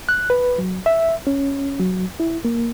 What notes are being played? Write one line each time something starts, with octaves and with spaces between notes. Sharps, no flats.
F#6
B4
F#3
E5
C#4
F#3
E4
A#3